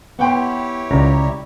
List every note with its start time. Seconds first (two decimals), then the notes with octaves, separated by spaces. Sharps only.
0.19 B3 E4 G4 C#5 F#5 G5 C6
0.91 C#2 D5 A#5